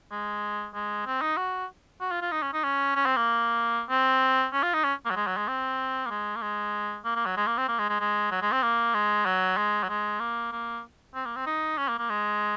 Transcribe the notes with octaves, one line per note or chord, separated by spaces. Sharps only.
G#3
G#3
C4
D#4
F#4
F#4
F4
F4
D#4
C#4
D#4
C#4
C#4
C4
A#3
C4
C#4
F4
D#4
C#4
A#3
F#3
G#3
F#3
G#3
C4
A#3
G#3
A#3
G#3
A#3
A#3
F#3
G#3
A#3
C4
A#3
G#3
G#3
G#3
F#3
G#3
C4
A#3
G#3
F#3
G#3
F#3
G#3
A#3
A#3
C4
A#3
C4
D#4
C#4
A#3
A#3
G#3